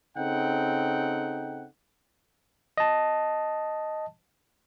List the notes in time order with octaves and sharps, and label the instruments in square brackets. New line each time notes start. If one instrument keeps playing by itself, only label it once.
[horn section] C#3 C4 D#4 A4 F#5 G5
[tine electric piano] D#5 A5